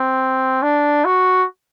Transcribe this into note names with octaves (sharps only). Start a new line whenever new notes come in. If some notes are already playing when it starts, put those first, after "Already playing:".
Already playing: C4
D4
F#4